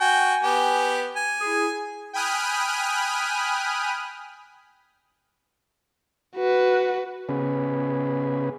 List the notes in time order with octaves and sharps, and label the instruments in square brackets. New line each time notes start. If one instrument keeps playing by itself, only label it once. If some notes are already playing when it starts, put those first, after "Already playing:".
[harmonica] F#4 G5 [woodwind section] G#5
[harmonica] B3 G4
G#5
[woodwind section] E4 G#4
[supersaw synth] G5 G#5 B5 D#6 F6 F#6
[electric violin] F#4 B4
[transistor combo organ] C#3 B3 C#4 G#4 B4